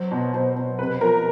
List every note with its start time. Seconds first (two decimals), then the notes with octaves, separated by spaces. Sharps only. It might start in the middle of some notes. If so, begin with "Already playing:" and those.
Already playing: F#3 C5
0.12 B2
0.34 B2 C5
0.56 B2
0.79 C3 B4
0.93 B4
1.01 F3 A#4